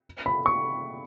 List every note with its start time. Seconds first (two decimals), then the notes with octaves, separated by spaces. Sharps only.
0.26 B5
0.46 C#6